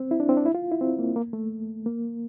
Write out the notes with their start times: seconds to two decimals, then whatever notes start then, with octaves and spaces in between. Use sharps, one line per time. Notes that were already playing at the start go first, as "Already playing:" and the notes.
Already playing: C4
0.11 E4
0.20 D4
0.29 C4
0.37 D4
0.46 E4
0.55 F4
0.72 E4
0.81 C4
0.99 A#3
1.16 A#3
1.33 A3
1.86 A#3